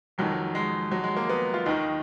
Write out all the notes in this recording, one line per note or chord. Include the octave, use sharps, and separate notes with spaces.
F1 F2 D#3 F#3
G#3
F#3
G#3
A#3
B3
F4
D#2 D#3 D#4